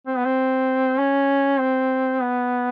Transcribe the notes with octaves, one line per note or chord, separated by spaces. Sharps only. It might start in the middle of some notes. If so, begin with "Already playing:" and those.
C4
B3
C4
C#4
C4
B3